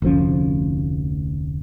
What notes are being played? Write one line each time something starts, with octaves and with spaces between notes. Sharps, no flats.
F1 D2 F3 C#4